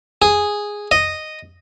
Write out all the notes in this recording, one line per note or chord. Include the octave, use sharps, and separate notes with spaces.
G#4
D#5